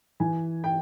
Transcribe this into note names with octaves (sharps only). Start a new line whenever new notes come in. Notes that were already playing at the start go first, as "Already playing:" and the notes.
E3 G#5
G5